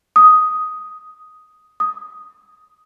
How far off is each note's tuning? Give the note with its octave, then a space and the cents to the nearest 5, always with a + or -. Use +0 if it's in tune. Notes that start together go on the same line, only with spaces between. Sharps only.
D#6 +5
D#6 +0